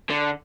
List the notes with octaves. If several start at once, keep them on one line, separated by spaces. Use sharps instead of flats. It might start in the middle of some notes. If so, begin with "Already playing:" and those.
D3